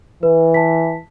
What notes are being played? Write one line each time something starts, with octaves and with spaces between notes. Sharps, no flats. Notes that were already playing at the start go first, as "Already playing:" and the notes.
E3 B4
A5 B6